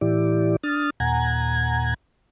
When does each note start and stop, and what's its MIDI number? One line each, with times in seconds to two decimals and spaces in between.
0.01 0.56 45
0.01 0.56 52
0.01 0.56 64
0.01 0.56 67
0.01 0.56 74
0.63 0.90 62
0.63 0.90 87
0.63 0.90 89
0.63 0.90 93
1.00 1.94 39
1.00 1.94 46
1.00 1.94 78
1.00 1.94 80
1.00 1.94 82
1.00 1.94 92